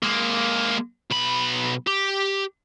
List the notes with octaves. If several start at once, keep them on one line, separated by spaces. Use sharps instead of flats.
G#3 A#3
B1 B5
G4